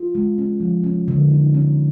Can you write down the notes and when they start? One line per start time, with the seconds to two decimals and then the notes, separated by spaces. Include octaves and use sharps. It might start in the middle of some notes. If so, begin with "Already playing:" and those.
Already playing: F4
0.15 G#3
0.38 C#4
0.60 F3
0.84 C#4
1.08 D3
1.30 D#4
1.54 C#4